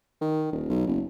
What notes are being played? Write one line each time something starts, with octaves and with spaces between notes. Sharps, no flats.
D#3
D#1
B1
F#1